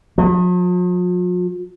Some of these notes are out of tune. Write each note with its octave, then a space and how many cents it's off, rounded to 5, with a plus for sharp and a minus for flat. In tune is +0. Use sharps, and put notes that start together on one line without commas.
F3 +45